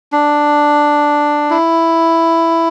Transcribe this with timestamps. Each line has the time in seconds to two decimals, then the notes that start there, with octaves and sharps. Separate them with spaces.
0.12 D4
1.50 E4